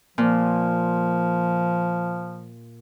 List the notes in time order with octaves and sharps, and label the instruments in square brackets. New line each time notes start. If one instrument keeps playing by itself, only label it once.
[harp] A#2 [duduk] F3